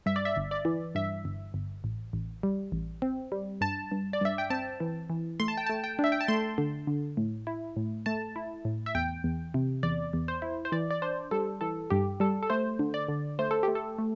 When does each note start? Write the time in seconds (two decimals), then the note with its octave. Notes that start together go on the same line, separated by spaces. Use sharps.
0.06 G2 E5
0.16 D5
0.25 E5
0.36 G1
0.51 D5
0.65 E3
0.95 G2 E5
1.25 G1
1.54 G1
1.84 A1
2.13 A1
2.43 G3
2.72 A1
3.02 C4
3.32 G3
3.61 G2 A5
3.91 G2
4.13 D5
4.21 G2 E5
4.38 G5
4.50 C4 A5
4.80 E3
5.10 E3
5.40 A3 C6
5.48 A5
5.57 G5
5.66 A3 A5
5.84 G5
5.99 D4
6.04 E5
6.12 G5
6.21 A5
6.28 A3 C6
6.58 D3
6.87 D3
7.17 A2
7.47 E4
7.77 A2
8.06 A3 A5
8.36 E4
8.65 A2
8.86 E5
8.95 E2 G5
9.24 E2
9.54 C3
9.83 E2 D5
10.13 E2
10.28 C5
10.42 E4
10.65 C5
10.72 E3 D5
10.91 D5
11.02 D4 C5
11.31 G3 A4
11.61 E3 A4
11.90 G2 G4
12.20 G3 A4
12.43 A4
12.50 A3 C5
12.79 D3
12.94 D5
13.08 D3
13.39 A3 C5
13.51 A4
13.63 G4
13.68 A3
13.75 A4
13.98 A3